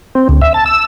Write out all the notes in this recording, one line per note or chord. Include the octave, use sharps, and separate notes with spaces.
C4
D2
E5
A5
E6